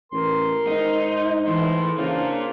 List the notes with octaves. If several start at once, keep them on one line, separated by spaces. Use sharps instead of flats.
A1 A#4 C6
G#2 D#4
E3 A3 E4 C6
C#3 A#3 D4 F4 C5